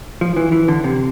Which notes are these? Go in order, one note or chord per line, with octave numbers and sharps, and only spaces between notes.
F3
E3
E3
D3
C3